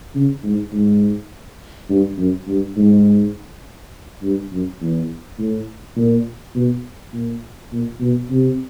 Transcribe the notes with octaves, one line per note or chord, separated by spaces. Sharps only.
C#3
G#2
G#2
G2
F#2
G2
G#2
G2
F#2
E2
A2
A#2
B2
A#2
A#2
B2
C3